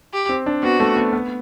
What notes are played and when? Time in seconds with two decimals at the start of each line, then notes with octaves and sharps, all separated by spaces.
0.14 G4
0.29 C4
0.46 D4
0.63 B3 F#4
0.80 A3
0.97 B3
1.13 B3